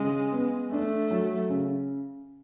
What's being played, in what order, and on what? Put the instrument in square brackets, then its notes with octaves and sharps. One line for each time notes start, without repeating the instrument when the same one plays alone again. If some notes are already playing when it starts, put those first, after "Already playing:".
Already playing: [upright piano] C#3 [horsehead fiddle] G#3
[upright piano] B3
[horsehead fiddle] A3 [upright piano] D4
[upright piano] F#3
C#3